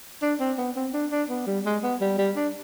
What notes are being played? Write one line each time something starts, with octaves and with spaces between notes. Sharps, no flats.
D4
C4
B3
C4
D4
D4
B3
G3
G#3
B3
G3
G3
D4